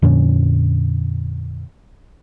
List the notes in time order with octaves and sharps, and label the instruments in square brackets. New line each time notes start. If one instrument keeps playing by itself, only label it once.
[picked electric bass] F2 A#2 D3 C#4